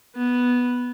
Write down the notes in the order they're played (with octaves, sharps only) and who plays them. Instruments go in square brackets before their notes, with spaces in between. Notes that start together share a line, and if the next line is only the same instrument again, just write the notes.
[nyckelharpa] B3